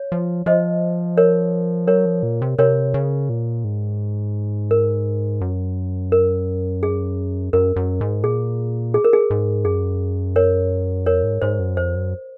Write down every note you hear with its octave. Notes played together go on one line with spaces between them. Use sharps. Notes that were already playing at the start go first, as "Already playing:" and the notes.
Already playing: C#5
F3
F3 C5 D#5
A#4 C#5
F#3 A#4 C#5
F3
A#2
C3
C3 A#4 C#5
C#3
A#2
G#2
A#4
F#2
A#4
G#4
F#2 A#4
F#2
G#2
A#2 G#4
G#4
A#4
G#4
G#2
F#2 G#4
A#4 C#5
F2 A#4 C#5
G#2
G#2 C5
F#2
F2 C5
F#2